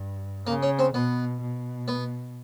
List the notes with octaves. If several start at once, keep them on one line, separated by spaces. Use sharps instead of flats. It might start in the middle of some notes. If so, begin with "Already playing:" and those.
Already playing: G2
C#3 A#3
C#4
C4
B2 B3
B2
B3